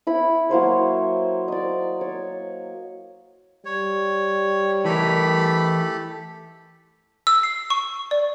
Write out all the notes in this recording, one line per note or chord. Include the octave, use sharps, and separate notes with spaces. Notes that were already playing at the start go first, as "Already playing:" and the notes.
E4 B5
F#3 A#3 C5 C#5
D5 D#5
C#5
G3 C#5
E3 A3 G4 A4 A#4 B5
E6
C7
C#6
D5